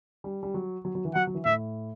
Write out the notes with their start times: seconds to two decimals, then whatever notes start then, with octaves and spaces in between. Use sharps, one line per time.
0.24 G3
0.43 G3
0.54 F#3
0.85 F#3
0.95 F#3
1.05 E3
1.15 F#3 F#5
1.27 F#3
1.35 E3
1.45 A2 E5